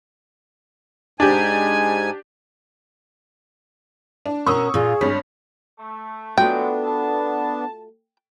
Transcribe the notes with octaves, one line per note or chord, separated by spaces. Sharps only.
G#2 D4 G4 G#5
D4
B2 C#4 A#4 C#6 D#6 E6
A#2 F4 G#4
G#1 G2 C#5 B6
A3
F#3 G#3 A3 B3 D4 F4 F#4 G5
A5